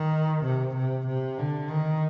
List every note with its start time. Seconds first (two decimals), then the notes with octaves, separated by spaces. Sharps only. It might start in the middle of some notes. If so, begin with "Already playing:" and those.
Already playing: D#3
0.45 C3
0.76 C3
1.07 C3
1.38 D3
1.70 D#3